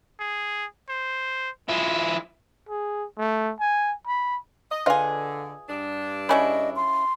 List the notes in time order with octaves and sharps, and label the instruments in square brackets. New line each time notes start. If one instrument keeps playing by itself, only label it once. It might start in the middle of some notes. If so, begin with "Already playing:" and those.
[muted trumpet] G#4
C5
[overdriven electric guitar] F3 E4 [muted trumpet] G#3
[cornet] G#4
A3
G#5
B5
[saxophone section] D#5
[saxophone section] D3 [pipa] F4 G#4 [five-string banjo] B4 D#5 F5
[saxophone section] G2 D4
[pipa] C#3 C#4 E4 [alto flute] D#5 [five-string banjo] B5
[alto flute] C6